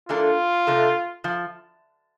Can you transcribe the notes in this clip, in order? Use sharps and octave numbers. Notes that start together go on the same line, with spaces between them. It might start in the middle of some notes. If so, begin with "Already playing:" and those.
E3 A#3 D4 F4 A4
C3 F3 A3 D4 A4
F3